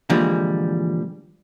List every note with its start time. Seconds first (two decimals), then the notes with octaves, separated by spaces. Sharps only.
0.10 A#2 D3 E3 F3 G3 G#3